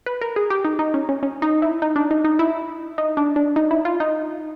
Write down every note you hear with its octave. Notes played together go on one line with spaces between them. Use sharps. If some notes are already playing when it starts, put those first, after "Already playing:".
B4
A#4
G#4
G4
D#4
D#4
C#4
C#4
C#4
D#4
E4
D#4
D4
D#4
D#4
E4
D#4
D4
D4
D#4
E4
F4
D#4